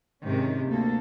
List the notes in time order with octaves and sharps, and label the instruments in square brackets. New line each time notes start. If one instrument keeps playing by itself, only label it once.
[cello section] G#2 C3 D#3 C#4
D2 A#3 A4